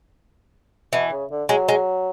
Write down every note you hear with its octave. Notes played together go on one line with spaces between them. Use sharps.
B2 E3
C#3
D3
F#3 G#3
G#3